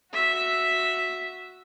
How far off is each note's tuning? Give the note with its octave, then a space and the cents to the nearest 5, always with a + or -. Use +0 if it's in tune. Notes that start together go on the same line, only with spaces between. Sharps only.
F#4 -10 E5 +0